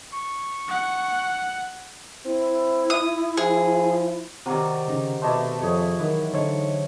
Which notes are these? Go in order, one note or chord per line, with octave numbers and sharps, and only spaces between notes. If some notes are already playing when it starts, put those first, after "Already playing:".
C#6
F#5
C4 E4
D#6
F3 G#4
C3 D#3 F#3 D5
C#3 D#4
B2 A3 D4 E4 D#5 C6
F2 G#4 C#5 C#6
D#3 E3 F#3 D#5
D3 D#4 A4 C5 C#5